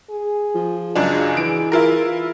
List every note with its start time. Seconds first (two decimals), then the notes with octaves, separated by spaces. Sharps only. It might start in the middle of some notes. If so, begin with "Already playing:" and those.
0.10 G#4
0.55 F3
0.96 C#2 F#2 D4 G#4
1.37 E3 D7
1.72 E4 F4 A#4